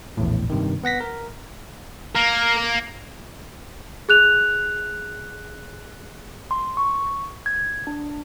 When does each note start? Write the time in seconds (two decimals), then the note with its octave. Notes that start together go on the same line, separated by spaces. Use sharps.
0.17 A#1 E2 A2
0.50 G2 C3 D#3
0.84 B3 F#5 A#6 B6
1.00 A#4
2.15 A#3 A#4
4.09 G#4 F#6 F7
6.51 C6
6.77 C#6
7.46 G#6
7.87 D4